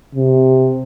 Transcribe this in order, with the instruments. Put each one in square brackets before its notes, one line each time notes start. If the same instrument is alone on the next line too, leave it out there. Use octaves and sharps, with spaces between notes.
[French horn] C3